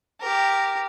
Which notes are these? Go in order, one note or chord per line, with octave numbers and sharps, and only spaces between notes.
G4 A#4